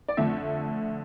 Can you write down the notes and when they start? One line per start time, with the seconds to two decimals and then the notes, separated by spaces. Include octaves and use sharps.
0.08 D5
0.17 F2 D3 A3 E5